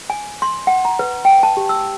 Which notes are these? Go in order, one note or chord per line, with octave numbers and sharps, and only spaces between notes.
G#5
C6
F#5
A#5
B4
G5
A5
G4
E6